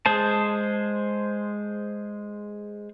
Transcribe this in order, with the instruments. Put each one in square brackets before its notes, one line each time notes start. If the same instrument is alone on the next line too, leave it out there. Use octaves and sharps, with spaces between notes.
[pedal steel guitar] G#3 G#4 C5 A5